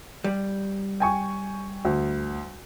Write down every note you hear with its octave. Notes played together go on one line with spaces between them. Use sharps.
G3
G5 G#5 C#6
D2